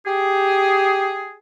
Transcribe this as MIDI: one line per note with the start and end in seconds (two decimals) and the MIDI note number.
0.05 1.35 67
0.05 1.35 68